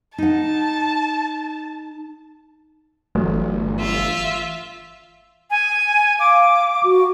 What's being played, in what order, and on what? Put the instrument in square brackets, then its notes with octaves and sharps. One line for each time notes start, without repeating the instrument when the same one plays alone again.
[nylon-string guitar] D#4 F#5 [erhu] A5
[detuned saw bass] G1 [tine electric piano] E3 [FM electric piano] F#3 A3
[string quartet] F4 E5
[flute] G#5
[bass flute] F5 [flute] D6
[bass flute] F#4